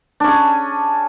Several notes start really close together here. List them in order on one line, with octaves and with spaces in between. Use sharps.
D4 C#4 G#4